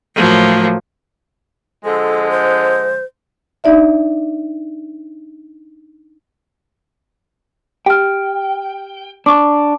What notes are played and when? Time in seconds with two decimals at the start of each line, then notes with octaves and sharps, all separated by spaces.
0.15 A2 F3 F#3 A#3
1.85 D3 F3 G#3 A4
2.31 C5
3.64 D4 D#4 D5 E5
7.86 G4 G5 F6
9.26 D4 C#6 D6